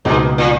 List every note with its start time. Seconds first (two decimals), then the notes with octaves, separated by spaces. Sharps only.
0.05 C#2 G#2 B2 A#3 D#4 F#4
0.38 A#2